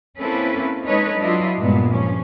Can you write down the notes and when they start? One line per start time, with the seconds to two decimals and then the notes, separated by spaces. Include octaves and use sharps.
0.19 A#3 C4 C#4 E4 A4 B4
0.84 G#3 D#4 A4 B4 C#5 D#5
1.19 F#3 D4 E4 F4 D#5
1.59 G2 A#2 G3 G#3 B3
1.89 G2 F3 C#4